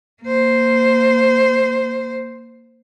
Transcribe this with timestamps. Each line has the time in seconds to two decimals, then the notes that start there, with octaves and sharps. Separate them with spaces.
0.23 A#3 C5